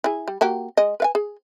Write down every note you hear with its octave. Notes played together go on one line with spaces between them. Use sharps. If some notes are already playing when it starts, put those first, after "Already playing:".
E4 G#4
G3
A#3 F#4 G4
G#3 D#5
B4 F5 G#5
G#4